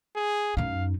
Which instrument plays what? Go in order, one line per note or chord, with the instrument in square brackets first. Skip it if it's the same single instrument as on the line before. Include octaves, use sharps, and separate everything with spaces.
[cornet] G#4
[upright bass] F#2 D#4 [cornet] F5